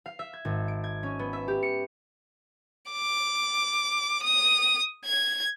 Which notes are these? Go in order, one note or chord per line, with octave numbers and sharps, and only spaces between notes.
F5
E5
G#6
G#1
D7
G#6
C#4
B3
E5
G4
C#7
D6
D#6
G#6